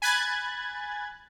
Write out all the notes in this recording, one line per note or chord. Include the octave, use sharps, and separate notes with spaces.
G#5 B5 F#6 G#6 A6